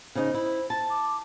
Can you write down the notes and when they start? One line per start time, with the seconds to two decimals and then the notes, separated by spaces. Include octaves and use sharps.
0.15 C#3 D#4 C5
0.34 E4
0.70 A5
0.90 D6